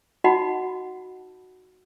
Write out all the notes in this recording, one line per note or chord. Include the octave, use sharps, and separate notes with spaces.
D#4 F#4 D#5 F#5 B5